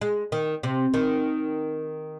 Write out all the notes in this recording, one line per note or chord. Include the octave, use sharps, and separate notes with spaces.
G#3
D#3
C3
D#3